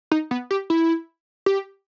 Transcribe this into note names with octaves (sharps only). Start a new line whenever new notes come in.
D#4
B3
G4
E4
G4